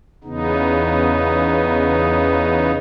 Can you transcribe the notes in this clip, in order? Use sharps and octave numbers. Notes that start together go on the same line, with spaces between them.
E2 C#3 B3 D#4